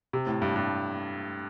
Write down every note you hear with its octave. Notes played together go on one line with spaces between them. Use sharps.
C3
A2
G2
G2